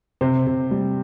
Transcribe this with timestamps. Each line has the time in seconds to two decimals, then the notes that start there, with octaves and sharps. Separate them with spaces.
0.21 C3 C5
0.47 C3
0.71 G3